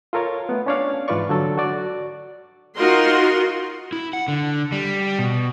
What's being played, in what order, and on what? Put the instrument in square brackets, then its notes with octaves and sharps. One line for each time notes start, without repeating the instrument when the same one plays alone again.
[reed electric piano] F4 A4 A#4 C#5 F5
A3 B3
C#4 D4 C#5 D5 F5
G#2 E3 F4 B4 D5 C#6
D3 F#3 A4
F#4 D5
[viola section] D#4 F4 F#4 A#4 C6
[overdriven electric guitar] E4
F#5
D3
G3
B2